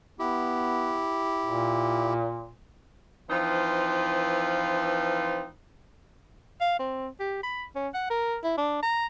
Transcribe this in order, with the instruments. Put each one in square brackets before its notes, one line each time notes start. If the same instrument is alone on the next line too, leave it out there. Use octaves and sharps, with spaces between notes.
[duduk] B3 [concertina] E4 G4
[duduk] A#2
[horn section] E3 F3 C4 D#4 F4 B4
[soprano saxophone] F5
C4
G4
B5
C#4
F#5
A#4
E4
D4
A#5